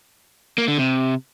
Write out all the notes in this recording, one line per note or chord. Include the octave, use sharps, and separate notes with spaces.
A#3
D3
C3